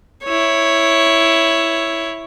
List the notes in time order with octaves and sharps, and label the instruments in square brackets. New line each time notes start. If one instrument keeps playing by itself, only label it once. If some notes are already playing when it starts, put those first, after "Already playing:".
[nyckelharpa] E4 C#5